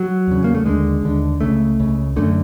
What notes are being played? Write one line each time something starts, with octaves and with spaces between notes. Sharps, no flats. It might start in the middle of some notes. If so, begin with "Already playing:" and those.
Already playing: F#3
E2 C#3
A#3
A3
D#2 D3 G#3
D#2 D3
C#2 C#3 A3
C#2 C#3
F#2 D3 A3